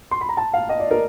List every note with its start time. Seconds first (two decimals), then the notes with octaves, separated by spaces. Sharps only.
0.11 C6
0.21 B5
0.29 A#5
0.37 A5
0.53 F5
0.69 D#5
0.79 D5
0.91 A#4